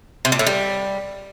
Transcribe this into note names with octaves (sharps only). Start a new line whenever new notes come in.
C3
A#2
A2
G3